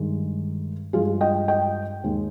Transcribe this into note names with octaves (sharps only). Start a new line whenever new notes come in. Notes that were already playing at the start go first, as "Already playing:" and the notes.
Already playing: G2 D#3 G#3
G2 F3 G#3 F4 G#4
D#5 G5
D#5 G5
D#2 D#3 G#3